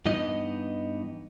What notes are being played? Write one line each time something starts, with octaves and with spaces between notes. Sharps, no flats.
G2 E3 B3 D#4 D#5